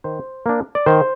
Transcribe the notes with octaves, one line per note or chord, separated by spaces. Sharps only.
D#3 C5
A#3 D4
D5
D#3 C5